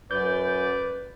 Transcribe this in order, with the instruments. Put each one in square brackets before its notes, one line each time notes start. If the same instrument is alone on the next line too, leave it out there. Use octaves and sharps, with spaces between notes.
[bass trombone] F#2 [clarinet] B4 [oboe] D5 [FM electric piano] G6